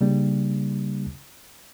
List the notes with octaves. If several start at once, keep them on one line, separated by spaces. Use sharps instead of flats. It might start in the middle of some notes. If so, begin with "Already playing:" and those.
C#3 G3 A#3 D4